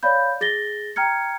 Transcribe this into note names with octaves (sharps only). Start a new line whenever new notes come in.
C#5 D5 F5 B5 G6
G#4 A6 A#6 G7
G5 A#5 F6 G#6 C#7